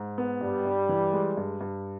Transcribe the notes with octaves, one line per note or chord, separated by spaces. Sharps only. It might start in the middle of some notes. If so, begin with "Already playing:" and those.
Already playing: G#2
B3
G2 G3
G2
E3
G#3
G2
G2